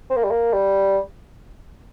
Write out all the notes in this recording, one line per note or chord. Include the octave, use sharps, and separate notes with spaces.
C4
A#3
G3
A#3
G3